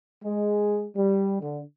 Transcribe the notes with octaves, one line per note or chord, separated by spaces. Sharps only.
G#3
G3
D3